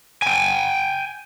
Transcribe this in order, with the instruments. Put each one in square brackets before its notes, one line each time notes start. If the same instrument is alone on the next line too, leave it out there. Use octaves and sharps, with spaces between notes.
[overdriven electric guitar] G5 G#5